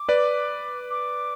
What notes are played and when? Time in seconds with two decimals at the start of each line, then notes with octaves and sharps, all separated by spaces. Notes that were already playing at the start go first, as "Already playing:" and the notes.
Already playing: D6
0.09 B4 D5
0.91 D6